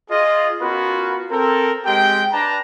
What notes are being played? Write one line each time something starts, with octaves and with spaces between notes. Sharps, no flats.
F4 G#4 D#5
B3 C#4 F4 F#4 A#4 B4
C4 A4 A#4
G#3 C4 G4 G5
D4 B4 A5 A#5